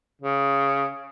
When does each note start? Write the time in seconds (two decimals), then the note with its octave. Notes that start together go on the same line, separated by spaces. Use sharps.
0.21 C#3